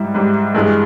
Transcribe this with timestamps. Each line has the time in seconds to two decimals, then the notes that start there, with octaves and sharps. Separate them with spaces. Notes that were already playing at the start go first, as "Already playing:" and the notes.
Already playing: G#2 G3 E4
0.15 G#2 G3
0.55 G2 E3 G#3